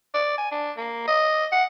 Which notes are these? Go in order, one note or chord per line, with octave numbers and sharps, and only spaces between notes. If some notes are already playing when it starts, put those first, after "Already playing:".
D5
G#5
D4
A#3
D#5
F#5